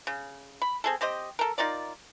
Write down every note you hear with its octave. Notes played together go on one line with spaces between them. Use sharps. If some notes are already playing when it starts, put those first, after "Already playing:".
C#3
B5
C4 G#4 A4
C4 G4 C5 D#5
A4 A#4
D#4 F4 A#4 D5